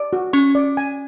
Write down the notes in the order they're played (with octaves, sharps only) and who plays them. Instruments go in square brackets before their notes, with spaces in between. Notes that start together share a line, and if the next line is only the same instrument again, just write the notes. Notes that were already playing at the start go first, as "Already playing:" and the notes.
Already playing: [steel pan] D5
F#4
[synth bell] C#4 [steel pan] C#6
[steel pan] D5
G#5